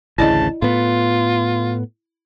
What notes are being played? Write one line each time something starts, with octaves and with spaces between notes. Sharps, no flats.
A1 D2 C#3 E4 D5 D#5 A5
A2 B3 F4